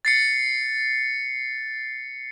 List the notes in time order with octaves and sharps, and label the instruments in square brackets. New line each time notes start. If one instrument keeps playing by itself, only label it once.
[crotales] A6 C7 C#7